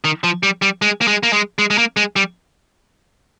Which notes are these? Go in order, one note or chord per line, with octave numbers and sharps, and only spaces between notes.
D#3
F3
G3
G3
G#3
A#3
G#3
A#3
G#3
G#3
G#3
A#3
G#3
G3